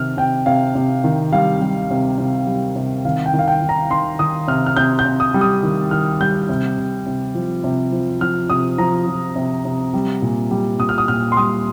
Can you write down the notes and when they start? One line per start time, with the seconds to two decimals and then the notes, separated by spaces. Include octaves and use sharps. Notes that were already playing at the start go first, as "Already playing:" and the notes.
Already playing: C3 D#3 F6
0.17 C3 G5
0.46 C3 F5
0.75 C3
1.04 D#3
1.33 G3 F5
1.61 G3
1.90 C3
2.18 C3
2.47 G3
2.76 C3
3.05 D#3 F5
3.26 G5
3.34 D#3
3.39 F5
3.48 G5
3.62 D#3
3.69 A#5
3.91 D#3 C6
4.19 D#3 D#6
4.48 C3 F6
4.66 F6
4.76 C3 G6
4.99 G6
5.05 C3
5.20 D#6
5.34 G3
5.41 D#6
5.63 D#3
5.91 D#3 F6
6.20 G3 G6
6.49 C3
6.77 C3
7.06 C3
7.35 F3
7.64 C3
7.92 F3
8.21 F3 F6
8.49 C3 D#6
8.78 F3 A#5
9.07 F3
9.36 C3
9.65 C3
9.94 G3
10.22 A#2
10.51 G3
10.79 A#2 D#6
10.89 F6
10.98 D#6
11.08 A#2 F6
11.32 C6
11.37 G3 D#6